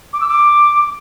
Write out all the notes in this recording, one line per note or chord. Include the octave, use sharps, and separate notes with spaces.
D6
E6
D6